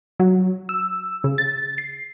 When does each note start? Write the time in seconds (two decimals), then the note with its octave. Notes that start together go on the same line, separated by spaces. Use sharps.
0.19 F#3
0.69 E6
1.24 C#3
1.38 A6
1.78 C7